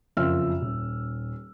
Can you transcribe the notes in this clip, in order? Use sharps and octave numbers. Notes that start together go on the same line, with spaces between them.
F#1 F2 F4 E5 E6 F6
D#1